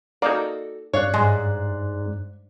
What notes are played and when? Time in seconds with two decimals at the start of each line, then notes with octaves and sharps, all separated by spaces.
0.22 A#3 D#4 F#4 A4 D5
0.93 G2 C#5 D5 F5 F#6
1.14 G#2 G#3